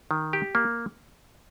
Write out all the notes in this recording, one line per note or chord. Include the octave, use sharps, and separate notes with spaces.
D#3
G4
A#3